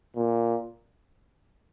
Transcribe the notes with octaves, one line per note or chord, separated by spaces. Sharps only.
A#2